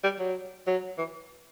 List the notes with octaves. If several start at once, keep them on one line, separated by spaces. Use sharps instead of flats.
G3
F#3
F#3
E3